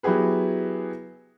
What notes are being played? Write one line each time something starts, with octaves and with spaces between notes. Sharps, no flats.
F#3 B3 E4 G4 G#4 B4